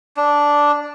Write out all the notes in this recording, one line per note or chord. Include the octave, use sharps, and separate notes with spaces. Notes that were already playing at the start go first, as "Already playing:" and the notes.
D4